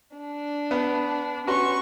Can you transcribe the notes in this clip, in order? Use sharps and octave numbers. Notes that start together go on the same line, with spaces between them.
D4
B3
C#4 F#4 B4 C6 C#6